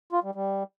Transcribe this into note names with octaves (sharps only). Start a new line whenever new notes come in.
F4
G3
G3